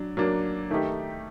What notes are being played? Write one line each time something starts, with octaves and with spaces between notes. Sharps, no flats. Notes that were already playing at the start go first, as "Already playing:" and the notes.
Already playing: F#3 D4
F#3 A#3 D4
D#3 A3 D#4 G4